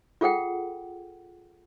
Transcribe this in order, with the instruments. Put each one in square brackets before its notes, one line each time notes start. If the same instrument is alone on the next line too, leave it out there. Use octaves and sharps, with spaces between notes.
[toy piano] F4 G#4 A4 F#5 G5